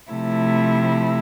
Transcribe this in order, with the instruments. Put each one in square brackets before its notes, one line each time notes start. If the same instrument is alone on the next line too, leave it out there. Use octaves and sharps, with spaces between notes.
[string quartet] C3 F3 A3 E4